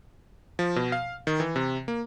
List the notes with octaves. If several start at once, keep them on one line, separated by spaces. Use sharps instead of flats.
F3
B2
F5
D#3
E3
C3
A#3